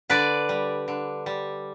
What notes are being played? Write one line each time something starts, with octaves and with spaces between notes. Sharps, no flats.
D3 B4 D5
G3
D3
G3